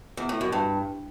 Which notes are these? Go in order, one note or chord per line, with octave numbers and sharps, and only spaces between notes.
E2
A2
F#2
G2